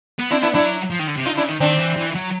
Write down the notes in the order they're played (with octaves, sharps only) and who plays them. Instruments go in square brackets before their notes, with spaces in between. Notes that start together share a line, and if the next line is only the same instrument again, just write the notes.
[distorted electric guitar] B3
[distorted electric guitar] C4 [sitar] D4 E4
[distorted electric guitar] B3 [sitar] D4 E4
[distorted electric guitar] F#3 [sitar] D4 E4
[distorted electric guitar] F3
D#3
D3
C3
[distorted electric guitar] D3 [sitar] D#4 F4
[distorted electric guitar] C#3 [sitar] D4 E4
[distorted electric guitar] D#3
[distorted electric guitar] D#3 [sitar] C4 D4
[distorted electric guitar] E3
E3
F#3